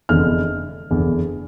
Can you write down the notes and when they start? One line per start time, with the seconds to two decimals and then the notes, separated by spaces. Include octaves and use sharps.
0.09 F1 E2 D3 F6
0.89 F1 E2 D3